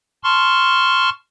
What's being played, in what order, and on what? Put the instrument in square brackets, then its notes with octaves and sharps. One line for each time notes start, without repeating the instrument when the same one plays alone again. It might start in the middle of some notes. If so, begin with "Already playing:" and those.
[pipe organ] A5 C6 C#6 F6